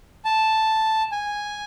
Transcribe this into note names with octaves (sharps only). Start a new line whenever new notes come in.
A5
G#5